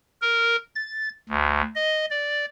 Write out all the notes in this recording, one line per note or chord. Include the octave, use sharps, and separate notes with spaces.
A#4
A6
D2
D#5
D5